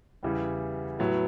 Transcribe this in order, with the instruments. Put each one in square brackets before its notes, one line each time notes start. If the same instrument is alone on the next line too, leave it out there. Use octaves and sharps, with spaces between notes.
[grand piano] E2 C#3 E3 G3
A2 F#3 B3